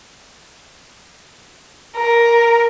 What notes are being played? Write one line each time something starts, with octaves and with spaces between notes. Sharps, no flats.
A#4